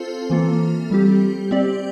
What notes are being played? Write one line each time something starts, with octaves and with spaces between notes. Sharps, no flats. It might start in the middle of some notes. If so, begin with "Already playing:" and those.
Already playing: C4 F4 A4 C5
E3 A#3 F4 A4
G3 C4 G4
C4 G4 D5